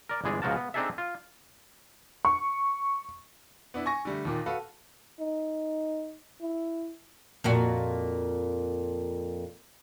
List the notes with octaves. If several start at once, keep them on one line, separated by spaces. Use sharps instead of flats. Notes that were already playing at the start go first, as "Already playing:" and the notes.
A#4 D5
G1 E3 G#3 G#4 D5
C#2 C#3 F3 F#4 A#4 A5
B3
C4 D4 D#4 G#4 A4 E5
F4
C#6
B3 D4 E4
G#5 C#6 A#6
D3 G3 A3
D#2 A#2 D#3
F#4 A4 B4 F5
D#4
E4
F2 A#2 F#4